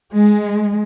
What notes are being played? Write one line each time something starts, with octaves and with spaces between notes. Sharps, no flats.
G#3